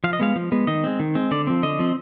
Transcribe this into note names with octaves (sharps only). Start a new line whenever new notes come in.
F3 F5
D#5
G#3 B3 F5
F3
G#3 B3
D#3 D#5
G#3 C4
D#3
G#3 C4
D3 D5
F3 C4
D3 D#5
F3 C4